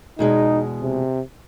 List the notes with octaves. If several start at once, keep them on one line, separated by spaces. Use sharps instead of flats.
E2 B2 G#3 D#4
C3